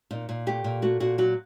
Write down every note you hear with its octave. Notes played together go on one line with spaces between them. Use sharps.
A#2 D#4
A#2
A3 G4
A#2
A3 F#4
A#2 F#4
F#3 F#4